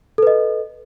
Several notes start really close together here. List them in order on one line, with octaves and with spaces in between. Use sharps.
A4 B4 D#5